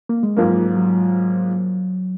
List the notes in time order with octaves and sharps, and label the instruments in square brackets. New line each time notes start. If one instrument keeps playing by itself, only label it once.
[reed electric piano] A#3
G#3
[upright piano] G#2 F3 A#3 [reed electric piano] F#3
[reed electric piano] F#3